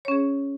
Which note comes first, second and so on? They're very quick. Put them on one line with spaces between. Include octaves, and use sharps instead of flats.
C#5 C#4 G#4